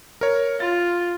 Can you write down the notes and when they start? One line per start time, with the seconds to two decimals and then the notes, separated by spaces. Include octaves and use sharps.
0.21 A#4 C#5
0.60 F4 A6